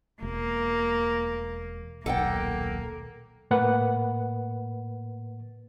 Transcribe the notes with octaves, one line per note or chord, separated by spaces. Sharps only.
E1 A#3
D#1 B1 A#3 A4 F#5 G5
A2 A#3 B4 F#5